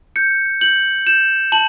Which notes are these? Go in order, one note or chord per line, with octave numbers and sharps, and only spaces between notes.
G6 C#7
G6 F#7
G6 E7
A5 F#7